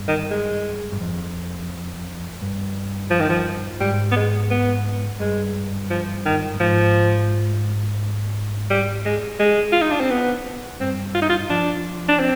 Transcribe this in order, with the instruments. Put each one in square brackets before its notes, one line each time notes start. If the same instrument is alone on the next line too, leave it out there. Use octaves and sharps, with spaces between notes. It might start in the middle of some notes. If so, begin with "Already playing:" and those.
Already playing: [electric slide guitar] G2
[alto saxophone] D#3
G#3
[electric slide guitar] G2
F2
G2
[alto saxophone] F3
D#3
F3
[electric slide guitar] G#2 [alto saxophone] G3
[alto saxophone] B3
G#3
B3
[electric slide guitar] G2 [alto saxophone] G#3
[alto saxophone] F3
D#3
[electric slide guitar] G2
[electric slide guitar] G#2 [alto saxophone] F3
[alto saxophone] G3
G#3
G#3
F4
D#4
D4
C4
B3
[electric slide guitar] G2 [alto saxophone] C4
[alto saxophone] F4
D#4
F4
[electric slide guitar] F3 [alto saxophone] D4
[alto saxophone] D4
C4